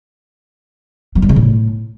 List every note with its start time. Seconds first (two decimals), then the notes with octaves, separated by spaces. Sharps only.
1.15 F#3
1.22 G2
1.29 C#3
1.36 A2